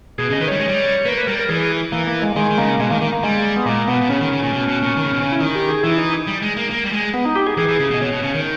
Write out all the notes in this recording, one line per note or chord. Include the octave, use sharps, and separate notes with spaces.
B2 G#4
C#3
D#5
D#3 B4
G3 C#5
G#3
G3
A#3 B4
B4
G3 A#4
A#4
E3 G#4
E3 A#3
A#3
G#3
D#3 G#3
D#3
C#3 A#3
B2 G#3
D#3 A#3
D#3 A#3
A#3
G3 G#3
B3
A#2 A#3
B2 B3
B2
C#3 C#4
D#3
C#3
A#2
B2
B2
A#2
D#3
C#3
B2
C#3
E4
D#3 D#4
G4
G#4
E3 E4
D#4
G3
G#3
A#3
A#3
G3
G#3
B3
D#4
G4
G#4
E3 G#4
E3
C#3
B2
D#5
B2 C#5
B2
C#3
D#3